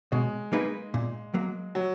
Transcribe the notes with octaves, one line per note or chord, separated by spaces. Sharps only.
B2 G#3
A#3 D#4 G#4 B4
A#2
F#3 A#3
F#3